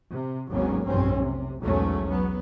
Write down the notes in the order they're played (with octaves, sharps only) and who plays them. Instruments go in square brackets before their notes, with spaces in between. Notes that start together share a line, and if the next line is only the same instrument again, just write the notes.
[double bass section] C3
G#1 D#2 F#3 A#3 B3 C#4
F1 B1 G2 C4 C#4
C3
B1 E2 G#2 F#3 A3 C#4
F#3 B3